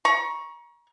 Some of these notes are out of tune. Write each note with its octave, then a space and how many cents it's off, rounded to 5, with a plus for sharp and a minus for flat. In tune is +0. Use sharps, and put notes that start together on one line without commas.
A#5 +35 C#6 +0